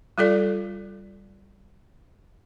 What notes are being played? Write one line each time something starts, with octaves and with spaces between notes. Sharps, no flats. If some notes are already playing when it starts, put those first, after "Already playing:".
G3 F4 A4 D5